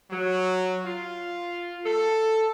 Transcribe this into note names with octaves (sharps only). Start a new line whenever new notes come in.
F#3
F4
A4